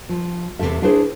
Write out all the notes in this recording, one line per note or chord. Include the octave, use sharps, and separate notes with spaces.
F3
E2 C3 F3 A4 E5
D4 E4 G#4 B4 C5